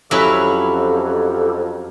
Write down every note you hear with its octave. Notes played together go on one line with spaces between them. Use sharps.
F2 F#3 C#4 E4 G4 A4 B4 E6